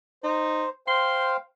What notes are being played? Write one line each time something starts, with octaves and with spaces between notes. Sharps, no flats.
D#4 C5
C5 F5 G5 C6